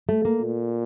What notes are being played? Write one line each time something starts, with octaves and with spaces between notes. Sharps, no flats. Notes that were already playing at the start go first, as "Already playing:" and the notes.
A3
A#3
A#2